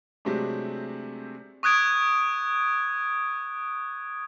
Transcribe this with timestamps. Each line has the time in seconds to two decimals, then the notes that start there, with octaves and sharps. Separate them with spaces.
0.25 C3 F#3 G#3 A3 C4 D4
1.63 C#6 D#6 F#6 G#6 D7